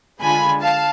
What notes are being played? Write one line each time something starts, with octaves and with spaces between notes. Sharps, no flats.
D3 G#3 D4 F4 G#5 B5
F5 A5